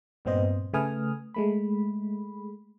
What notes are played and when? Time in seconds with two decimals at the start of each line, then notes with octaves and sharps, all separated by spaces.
0.25 G2 A#2 B3 C4 C5 D#5
0.73 C#3 A3 B4 G#5 D#6 F6
1.34 G#3 A3 B5